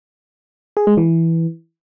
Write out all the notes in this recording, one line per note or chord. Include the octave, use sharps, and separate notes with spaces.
G#4
G#3
E3